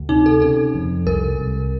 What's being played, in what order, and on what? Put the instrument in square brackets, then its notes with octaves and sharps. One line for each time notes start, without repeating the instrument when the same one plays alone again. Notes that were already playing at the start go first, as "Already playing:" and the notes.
Already playing: [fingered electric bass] D2
[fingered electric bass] C3 [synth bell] D#4
[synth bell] A4
[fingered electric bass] C#3 [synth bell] A4
[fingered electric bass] F2
[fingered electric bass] C2 [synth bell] A#4
[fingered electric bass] C2